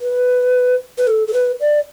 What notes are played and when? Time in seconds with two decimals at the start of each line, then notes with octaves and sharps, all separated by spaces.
0.01 B4
0.98 B4
1.07 A4
1.27 A4
1.33 B4
1.60 D5